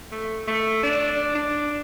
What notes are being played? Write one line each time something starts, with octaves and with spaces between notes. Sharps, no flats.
A3
A3
D4
D4